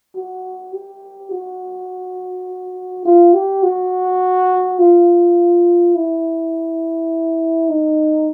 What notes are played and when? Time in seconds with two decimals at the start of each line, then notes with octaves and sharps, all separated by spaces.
0.16 F#4
0.73 G4
1.32 F#4
3.05 F4
3.34 G4
3.63 F#4
4.79 F4
5.96 E4
7.69 D#4